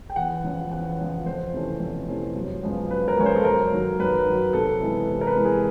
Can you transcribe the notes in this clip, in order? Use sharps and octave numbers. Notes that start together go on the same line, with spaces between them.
G5
E2 F#5
C#3 F3
E2 F#5
C#3 F3
F2 C5
C3 E3 A3 C#4
F2
C3 E3 A3 C#4
F#2
C#3 F3 G#3 B3
F#2 B4
A#4
C#3 F3 G#3 B3 C#5
C5
A4
F#2 A#4
D#3 F#3
F#2 B4
D#3 F#3
C3 A4
E3 G#3 B3 E4
C3
A#4
B4
E3 G#3 B3 E4
G#4